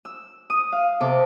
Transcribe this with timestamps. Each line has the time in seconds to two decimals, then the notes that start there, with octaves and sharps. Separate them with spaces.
0.05 E6
0.50 D#6
0.72 F5
1.00 C3 A4 D6